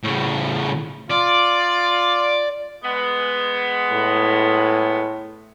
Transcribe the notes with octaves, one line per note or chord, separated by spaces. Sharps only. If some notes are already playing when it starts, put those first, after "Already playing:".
A2 C#3
F4 D5
G#3 B3
A2